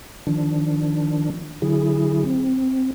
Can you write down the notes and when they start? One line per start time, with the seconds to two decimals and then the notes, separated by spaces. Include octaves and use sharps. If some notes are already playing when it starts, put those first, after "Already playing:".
0.27 D#3 F3 D4
1.62 D3 F#3 E4 G#4
2.25 C4